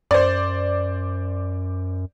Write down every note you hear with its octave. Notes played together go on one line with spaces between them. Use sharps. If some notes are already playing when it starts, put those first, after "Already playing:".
F#2 C5 D5